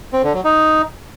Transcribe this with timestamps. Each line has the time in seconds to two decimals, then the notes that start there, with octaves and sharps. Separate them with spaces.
0.13 C4
0.23 D3
0.34 F#3
0.44 D#4